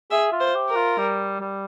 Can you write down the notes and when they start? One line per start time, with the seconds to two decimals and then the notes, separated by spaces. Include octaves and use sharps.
0.11 G#4 E5
0.32 F4
0.40 C5
0.55 G4
0.69 A#4
0.76 F4
0.98 G3
1.40 G3